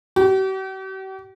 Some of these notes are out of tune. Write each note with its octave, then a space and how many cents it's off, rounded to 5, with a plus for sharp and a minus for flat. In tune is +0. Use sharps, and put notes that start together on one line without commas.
G4 -45